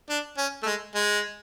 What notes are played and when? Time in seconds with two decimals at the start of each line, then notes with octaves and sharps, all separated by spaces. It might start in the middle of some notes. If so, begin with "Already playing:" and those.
0.09 D4
0.38 C#4
0.63 A3
0.66 G#3
0.95 G#3